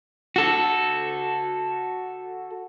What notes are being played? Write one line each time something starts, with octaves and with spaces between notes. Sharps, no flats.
F#4 A4